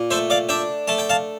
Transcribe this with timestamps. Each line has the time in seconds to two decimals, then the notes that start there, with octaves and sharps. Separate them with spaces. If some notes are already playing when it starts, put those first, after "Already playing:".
Already playing: A#2
0.11 A3 C5 E5
0.30 D5 F5
0.49 D4 E5 G5
0.88 A3 A5
0.98 G5
1.10 F5 A5